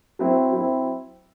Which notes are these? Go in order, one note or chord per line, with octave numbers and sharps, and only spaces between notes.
F#3 C4 E4
F#3 C4 E4